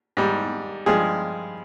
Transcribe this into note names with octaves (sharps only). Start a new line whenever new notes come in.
G#2 G3
G2 F3 G#3 G#4